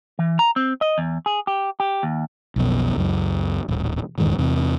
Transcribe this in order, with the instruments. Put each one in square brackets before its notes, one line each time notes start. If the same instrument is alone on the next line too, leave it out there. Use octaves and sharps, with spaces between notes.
[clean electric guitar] E3
A#5
C4
D#5
E2
G#4
G4
G4
D#2
[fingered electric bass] B1 F2 B2
C#2 F#2
D#1 A1
D#1 E2 G#2 D#3
E2 C3